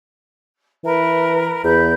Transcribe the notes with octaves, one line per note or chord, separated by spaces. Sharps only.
E3 A#4 B4
E2 B4 G6